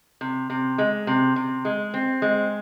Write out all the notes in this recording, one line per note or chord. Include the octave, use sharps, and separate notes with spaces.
C3
C3
G#3
C3
C3
G#3
C4
G#3